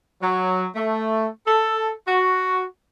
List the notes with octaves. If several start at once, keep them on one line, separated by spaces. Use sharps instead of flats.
F#3
A3
A4
F#4